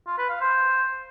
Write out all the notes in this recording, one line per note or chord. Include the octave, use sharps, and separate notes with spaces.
F4
B4
F5
C5